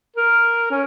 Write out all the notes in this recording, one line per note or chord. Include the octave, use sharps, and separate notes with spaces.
A#4
C#4